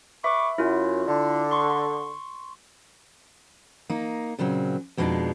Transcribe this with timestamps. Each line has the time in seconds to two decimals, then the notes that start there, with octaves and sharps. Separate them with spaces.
0.24 B4 E5 B5 C#6 D6
0.58 F#2 E4 F4
1.08 D3
1.51 C6 C#6
3.90 A#3 D#4
4.39 A#2 C#3 F#3 C4
4.97 F2 B2 G#3 A#3 D4 D#4